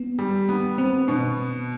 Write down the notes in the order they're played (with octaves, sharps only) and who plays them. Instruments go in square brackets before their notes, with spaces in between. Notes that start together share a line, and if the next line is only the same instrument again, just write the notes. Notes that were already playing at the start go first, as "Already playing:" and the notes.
Already playing: [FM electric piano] B3
[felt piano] G3
B3
[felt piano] B3 [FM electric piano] C4
[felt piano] B2